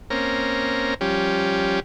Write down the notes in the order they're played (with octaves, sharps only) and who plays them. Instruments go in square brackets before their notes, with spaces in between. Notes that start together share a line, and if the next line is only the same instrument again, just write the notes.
[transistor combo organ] A#3 C4 C#4 A#5
F3 G3 C#4 G4